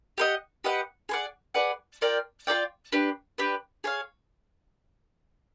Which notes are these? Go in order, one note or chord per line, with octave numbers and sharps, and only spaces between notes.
G4 B4 D#5 F#5
G4 B4 D#5 F#5
G#4 B4 D5 F#5
G#4 B4 D5 F#5
F4 A#4 D5 G5
F4 A#4 D5 G5
D4 G4 B4
D4 G4 B4
G#4 C#5 F5